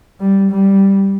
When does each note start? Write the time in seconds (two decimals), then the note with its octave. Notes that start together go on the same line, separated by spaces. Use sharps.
0.20 G3
0.50 G3